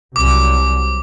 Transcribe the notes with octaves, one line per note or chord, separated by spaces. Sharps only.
C2 F#3 D6